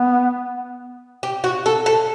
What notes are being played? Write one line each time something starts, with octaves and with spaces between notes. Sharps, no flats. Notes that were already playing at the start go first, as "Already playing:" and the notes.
Already playing: B3
G4
F#4
A4
A4